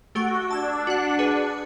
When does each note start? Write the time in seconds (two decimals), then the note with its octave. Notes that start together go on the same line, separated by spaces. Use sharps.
0.15 A3 F#4 G4 C#6
0.51 D4 A5 E6 G#6
0.87 F#4 F#5
1.19 G#4 B4 C#7